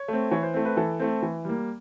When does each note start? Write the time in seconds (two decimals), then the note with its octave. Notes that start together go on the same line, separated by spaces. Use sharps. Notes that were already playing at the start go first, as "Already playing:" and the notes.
Already playing: C#5
0.08 A3 C4
0.31 E3 C#5
0.43 C5
0.54 A3 C4
0.65 B4
0.77 E3 A4
1.00 A3 C4
1.22 E3
1.45 G3 A#3